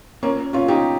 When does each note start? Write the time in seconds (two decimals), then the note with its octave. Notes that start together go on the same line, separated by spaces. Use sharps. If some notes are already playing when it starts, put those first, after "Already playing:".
0.23 A#2 A#3 C#4
0.53 A#2 C#4 F4
0.68 D#4 G4